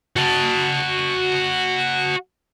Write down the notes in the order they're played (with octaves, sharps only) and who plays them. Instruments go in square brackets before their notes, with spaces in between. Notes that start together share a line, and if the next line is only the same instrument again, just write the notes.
[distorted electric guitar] F#4 A5